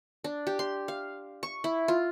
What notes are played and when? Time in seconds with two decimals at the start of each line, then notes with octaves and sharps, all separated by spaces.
0.24 D4
0.47 G4
0.59 C6
0.88 F5
1.43 C#6
1.64 E4
1.88 F4